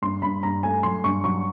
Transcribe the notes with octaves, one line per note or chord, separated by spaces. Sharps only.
G2 C6
G2 B5
G2 A#5
A3 G#5
F#3 C6
G2 C#6
F#3 C#6